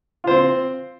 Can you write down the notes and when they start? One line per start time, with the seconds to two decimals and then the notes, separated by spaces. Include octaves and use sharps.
0.24 F4
0.27 C5
0.31 C4